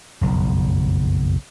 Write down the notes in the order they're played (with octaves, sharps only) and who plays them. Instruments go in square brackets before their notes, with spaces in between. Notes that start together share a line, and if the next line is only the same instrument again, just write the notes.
[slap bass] F#1 B1 F2